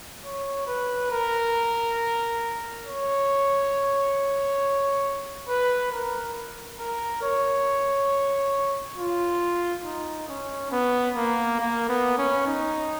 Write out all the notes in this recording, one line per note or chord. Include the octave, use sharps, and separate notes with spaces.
C#5
B4
A#4
C#5
B4
A#4
A#4
C#5
F4
D#4
C#4
B3
A#3
A#3
B3
C#4
D#4